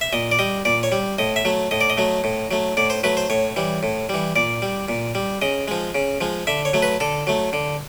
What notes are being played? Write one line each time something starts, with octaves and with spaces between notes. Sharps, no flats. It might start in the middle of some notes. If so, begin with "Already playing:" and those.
E5
A#2 D#5
D5
G3 D#5
A#2 D5
C#5
G3
A2 D#5
E5
F#3 A3
A2 D#5
D5
D#5
F#3 A3
A2
F#3 A3
A2 D5
C5
F#3 A3 B4
C5
A2 C#5
E3 G3
A2
E3 G3
A#2 D5
G3
A#2
G3
C#3 D#5
F3 G#3
C#3
F3 G#3
D3 E5
C#5
F#3 A3
B4
D3 A4
F#3 A3
D3